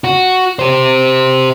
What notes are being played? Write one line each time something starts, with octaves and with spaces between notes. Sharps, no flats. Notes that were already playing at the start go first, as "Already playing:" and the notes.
F#4
G4 C5